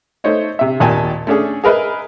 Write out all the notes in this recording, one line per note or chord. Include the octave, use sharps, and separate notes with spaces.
A3 D#4 C5 C#5 D#5
C3 E5
G#1 D#2 A#2 G#5 A5
A3 C#4 D4 G#4
G#4 A#4 B4 D#5 E5